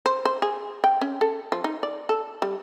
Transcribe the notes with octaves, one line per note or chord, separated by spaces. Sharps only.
C5
C5
G#4
G5
C#4
A4
F3
D#4
D5
A4
G3